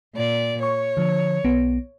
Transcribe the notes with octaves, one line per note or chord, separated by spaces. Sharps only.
A#2 D5
C#5 C#6
D3 F3
B1 B3